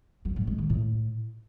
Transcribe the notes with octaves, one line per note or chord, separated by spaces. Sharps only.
F#3
A2
G#3
D#3
A2